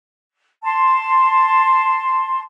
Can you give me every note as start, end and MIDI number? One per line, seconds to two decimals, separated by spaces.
0.63 2.40 81
0.63 2.40 84